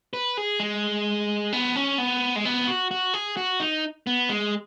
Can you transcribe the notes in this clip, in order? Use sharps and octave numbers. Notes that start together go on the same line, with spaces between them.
B4
G#4
G#3
B3
C#4
B3
G#3
B3
F#4
F#4
G#4
F#4
D#4
B3
G#3